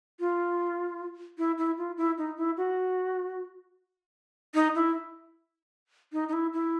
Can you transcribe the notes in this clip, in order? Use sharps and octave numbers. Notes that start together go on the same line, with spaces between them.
F4
E4
E4
F4
E4
D#4
E4
F#4
D#4
E4
D#4
D#4
E4
E4